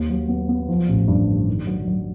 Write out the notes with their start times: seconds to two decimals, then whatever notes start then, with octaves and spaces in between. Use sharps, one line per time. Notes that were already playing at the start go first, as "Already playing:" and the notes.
Already playing: D#2
0.10 F#3
0.29 B3
0.49 B3
0.69 F3
0.89 A1
1.08 G2
1.28 D3
1.47 D#3
1.67 F#3
1.88 F#3